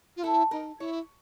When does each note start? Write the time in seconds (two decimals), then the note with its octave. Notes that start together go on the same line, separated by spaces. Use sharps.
0.17 F4
0.23 E4 A4
0.51 D#4 A#4
0.79 E4 C#5